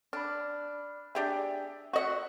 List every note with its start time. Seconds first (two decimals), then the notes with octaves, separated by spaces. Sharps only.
0.13 D4 B5 F6
1.15 D4 G4 G#4 E5
1.93 F#4 D#5 E5 F#5